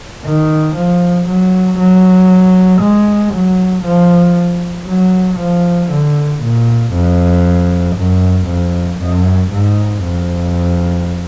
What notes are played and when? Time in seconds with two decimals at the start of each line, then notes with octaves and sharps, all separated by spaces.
0.25 D#3
0.76 F3
1.28 F#3
1.79 F#3
2.82 G#3
3.34 F#3
3.85 F3
4.88 F#3
5.40 F3
5.91 D3
6.43 A#2
6.94 F2
7.97 F#2
8.48 F2
9.00 F#2
9.52 G#2
10.03 F2